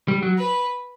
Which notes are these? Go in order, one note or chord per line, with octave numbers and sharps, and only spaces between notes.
G3
F#3
B4